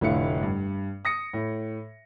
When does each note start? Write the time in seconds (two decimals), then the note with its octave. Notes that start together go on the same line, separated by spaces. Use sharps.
0.01 F1 A2 D3 E4 F5 C#7
0.42 G2
1.05 D#6 A#6 C#7
1.33 A2